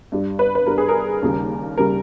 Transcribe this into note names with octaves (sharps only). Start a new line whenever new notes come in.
G2 G3
B4
B4
G2 G3 A#4
G#4
A#4
D#2 C#3 G3
C#3 G3 A#4